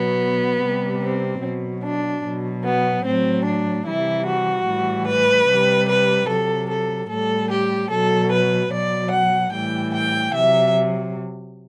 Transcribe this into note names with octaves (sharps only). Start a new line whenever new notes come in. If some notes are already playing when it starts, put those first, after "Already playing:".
Already playing: B2 F#3 B3
C3 G3
C4
B2 F#3
D4
B2 F#3
B3
A2 F#3 C4
D4
C3 E3 G3 E4
F#4
A2 E3 G3
B4
C3 G3
B4
C3 F#3 A4
A4
A2 G3 A4
G4
B2 F#3 A4
B4
B2 F#3 D5
F#5
A2 E3 G3 G5
G5
C3 F#3 E5